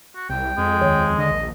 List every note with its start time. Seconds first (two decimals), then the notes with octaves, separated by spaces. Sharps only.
0.15 F#4
0.29 C2 G5
0.58 F2 G#3
0.81 D#2 D#3 C#5
1.18 D3 D#5
1.31 A#1